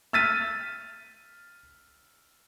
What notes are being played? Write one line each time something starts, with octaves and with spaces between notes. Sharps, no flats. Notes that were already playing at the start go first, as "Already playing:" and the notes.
E6 F6 A6 B6 D#7